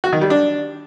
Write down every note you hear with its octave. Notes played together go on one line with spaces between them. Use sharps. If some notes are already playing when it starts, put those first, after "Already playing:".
F#4
D#3
G3
D4